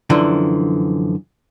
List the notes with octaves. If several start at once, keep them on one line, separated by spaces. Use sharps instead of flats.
F#2 D3 E3 F3